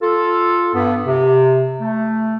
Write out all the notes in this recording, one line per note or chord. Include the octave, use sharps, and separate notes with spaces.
F4 A4
G2 B3
C3
A3